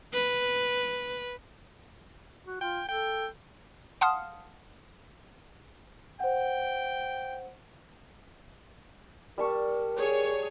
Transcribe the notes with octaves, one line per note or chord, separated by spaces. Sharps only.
B4
F#4
F4 G5
A4 G5
F5 F#5 A5 C6 D#6 F6
C5 F#5 G5
G3 A#4 A5 C#6
G#4 C#5